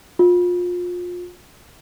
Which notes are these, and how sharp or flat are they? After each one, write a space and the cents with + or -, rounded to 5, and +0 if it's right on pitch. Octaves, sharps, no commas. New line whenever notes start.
F4 +25